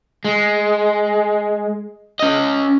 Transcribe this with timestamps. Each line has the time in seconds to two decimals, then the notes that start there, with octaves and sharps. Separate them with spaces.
0.25 G#3
2.20 C#4 D#5